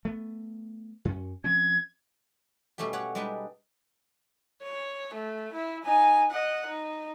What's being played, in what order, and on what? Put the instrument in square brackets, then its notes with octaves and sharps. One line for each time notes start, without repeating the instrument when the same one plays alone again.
[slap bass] A3 B3
F#2 C#4
[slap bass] F3 C4 C#4 [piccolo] G#6
[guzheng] B2 G3 A3 C#4 G4
G4 C#5 F#5
G3 G#3 D4 D#4 B4
[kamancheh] C#5
A3
E4 E5
D#4 G#5
D#5 F#5
D#4